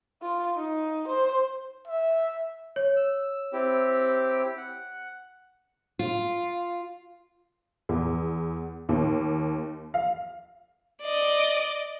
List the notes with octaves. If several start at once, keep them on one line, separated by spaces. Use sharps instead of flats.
F4
D#4
C5
E5
C#5
E6
C4 E4 G4
F#5
F4
E2
D#2
F5
D5 D#5